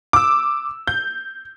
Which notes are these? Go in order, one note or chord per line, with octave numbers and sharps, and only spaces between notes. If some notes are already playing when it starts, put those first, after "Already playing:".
D6 E6
G6